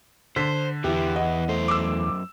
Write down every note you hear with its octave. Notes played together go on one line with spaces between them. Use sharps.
D3 C5 B6
E2 E3 B3 E4 G4
D#5 F#5
F#2 A3 C5
D6 E6